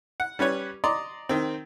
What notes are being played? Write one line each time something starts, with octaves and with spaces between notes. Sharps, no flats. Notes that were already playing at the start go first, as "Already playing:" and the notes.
F#5
G3 C#4 B4 C#5
D5 D#5 A#5 C6
D#3 C4